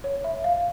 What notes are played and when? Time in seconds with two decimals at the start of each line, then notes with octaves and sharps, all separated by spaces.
0.04 C#5
0.24 E5
0.44 F5